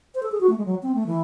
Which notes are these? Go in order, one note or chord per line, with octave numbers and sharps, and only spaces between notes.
C5
A4
G#4
F#4
A3
G#3
F#3
C4
A3
E3